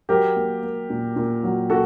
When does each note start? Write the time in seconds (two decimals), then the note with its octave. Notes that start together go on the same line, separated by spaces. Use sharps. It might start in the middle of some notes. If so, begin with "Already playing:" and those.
0.09 F#3 G4 A#4
0.36 A#3
0.63 A#3
0.90 A#2
1.16 A#2
1.43 F#3
1.70 A#2 F#4 A4